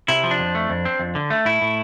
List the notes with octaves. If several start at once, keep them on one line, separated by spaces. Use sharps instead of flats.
C3 E4
F3
D4
F2
A3
F2
C4
F2
D3
A3
A2 E4
A2